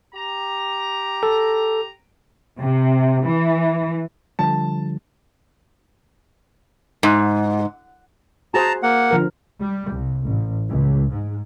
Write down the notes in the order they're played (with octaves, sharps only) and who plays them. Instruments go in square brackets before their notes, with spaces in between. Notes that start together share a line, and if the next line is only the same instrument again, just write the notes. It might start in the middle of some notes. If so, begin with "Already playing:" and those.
[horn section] G4 A#5
[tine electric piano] A4
[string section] C3
E3
[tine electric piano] D3 F3 G3 [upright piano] A5
[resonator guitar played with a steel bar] G#2
[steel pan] F#4 G#4 C5 [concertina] A5 A#5
[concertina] A#3 F#5
[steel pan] D3 F3 A#4
[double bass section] G3
C2
A1
C#2
G#2